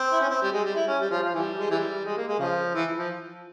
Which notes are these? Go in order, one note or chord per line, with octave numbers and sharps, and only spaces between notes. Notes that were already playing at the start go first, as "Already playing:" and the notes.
Already playing: C4
E4
C#4
C4
G3
G#3
G3
E4
C#4
G3
F3
F3
E3 G3
G#3
E3 G3
G#3
A#3
G#3
C#3 F3
E3
F3